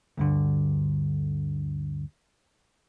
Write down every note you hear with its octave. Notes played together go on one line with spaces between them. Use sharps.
D2 G2 D3